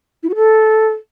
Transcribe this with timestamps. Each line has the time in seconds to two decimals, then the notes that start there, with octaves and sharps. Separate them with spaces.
0.23 E4
0.29 F#4
0.36 A4